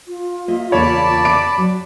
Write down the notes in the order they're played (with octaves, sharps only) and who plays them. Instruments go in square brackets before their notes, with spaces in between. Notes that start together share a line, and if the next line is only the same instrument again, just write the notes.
[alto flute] F4
[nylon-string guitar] A#3 D#5 E5
[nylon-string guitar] E2 C#3 A#3 [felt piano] C#5 [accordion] D5 A5 B5
[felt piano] D6 D7
[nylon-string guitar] F#3